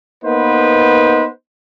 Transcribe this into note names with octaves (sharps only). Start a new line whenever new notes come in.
A#3 B3 D#4 B4 C5